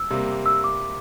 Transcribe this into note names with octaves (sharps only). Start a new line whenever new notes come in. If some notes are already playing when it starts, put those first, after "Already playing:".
Already playing: E6
C3 G3 A#3
E6
D6